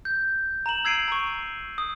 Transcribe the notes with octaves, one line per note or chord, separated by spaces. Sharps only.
G6
A#5 E7 F#7
E6 G#6 C7 D7 D#7
A#5 C#6
D#6